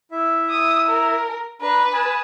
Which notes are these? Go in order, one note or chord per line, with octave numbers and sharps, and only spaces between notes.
E4 E5
D#6
A#4
D4 B4 A#5
G#5 A5 D#6